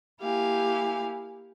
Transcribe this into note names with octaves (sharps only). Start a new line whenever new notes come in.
A#3 E4 G4 F5 G#5